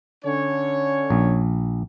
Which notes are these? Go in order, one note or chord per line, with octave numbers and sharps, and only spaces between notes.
D3 C#4 C#5
A#1